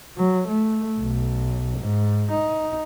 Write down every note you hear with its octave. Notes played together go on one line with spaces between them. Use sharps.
F#3
A3
B1
G#2
D#4